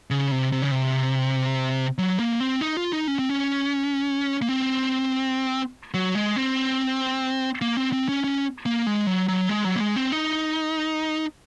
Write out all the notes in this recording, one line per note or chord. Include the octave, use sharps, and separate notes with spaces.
C#3
C3
C3
C#3
C3
F#3
A#3
C4
D#4
F4
D#4
C#4
C4
C#4
A#3
C4
F#3
G#3
C4
A#3
C4
C4
C#4
C#4
A#3
G#3
F#3
F#3
G#3
F#3
A#3
G#3
C4
D#4